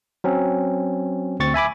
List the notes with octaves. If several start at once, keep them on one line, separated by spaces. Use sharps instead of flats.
F#3 C4 C#4
D2 C4 C#6 A6
E5 G#5 B5 D6